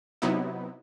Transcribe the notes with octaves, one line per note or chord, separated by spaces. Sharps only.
C3 F#3 B3 D#4 E4